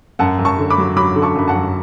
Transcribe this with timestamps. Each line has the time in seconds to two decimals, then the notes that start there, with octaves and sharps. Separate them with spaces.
0.19 F#2 F#5 A5
0.39 F#2
0.45 A5 C#6
0.58 D3
0.70 B5 D6
0.78 F#3
0.96 F#3 B5 D6
1.16 D3
1.22 A5 C#6
1.36 F#2 B5
1.48 F#5 A5
1.55 F#2